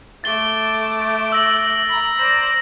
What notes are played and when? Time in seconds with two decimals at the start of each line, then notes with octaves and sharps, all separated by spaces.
0.24 A3 D6 A6 G7
1.32 E6 A#6 F#7
1.89 A#5 B5
2.19 C5 D5 A#6